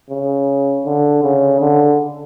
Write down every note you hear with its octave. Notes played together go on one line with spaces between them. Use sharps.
C#3
D3
C#3
D3